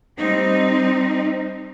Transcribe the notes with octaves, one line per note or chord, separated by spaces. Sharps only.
G3 C4 D#4